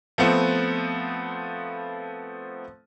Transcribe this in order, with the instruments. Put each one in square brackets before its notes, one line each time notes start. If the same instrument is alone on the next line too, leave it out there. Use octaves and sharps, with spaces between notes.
[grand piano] F3 A3 B3 C4